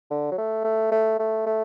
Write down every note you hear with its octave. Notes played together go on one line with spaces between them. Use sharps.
D3
F#3
A3
A3
A3
A3
A3